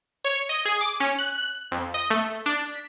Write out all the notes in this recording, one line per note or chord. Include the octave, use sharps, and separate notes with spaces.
C#5
D#5
G#4
D6
C#4
F#6
F#6
F2
D#5
A3
D4
B6